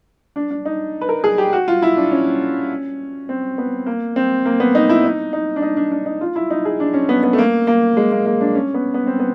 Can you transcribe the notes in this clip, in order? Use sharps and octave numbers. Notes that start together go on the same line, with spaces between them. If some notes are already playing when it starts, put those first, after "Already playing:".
D4
D4
D#4
B4
A#4
G#4
G4
F#4
F4
E4
D4
C#4
C4
B3
A#3
C4
A#3
B3
D#4
E4
D#4
D#4
D4
D#4
D4
D4
D#4
F4
E4
D#4
G#4
D4
C#4
B3
B3
A3
A#3
A#3
G#3
A#3
A#3
D4
C#4
B3
B3
C4
B3